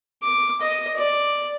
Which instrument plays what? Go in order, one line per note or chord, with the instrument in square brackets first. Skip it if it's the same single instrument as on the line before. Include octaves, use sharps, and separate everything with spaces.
[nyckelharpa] D6
D#5
D5